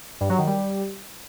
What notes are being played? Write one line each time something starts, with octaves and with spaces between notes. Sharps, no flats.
G2
F#3
D#3
G3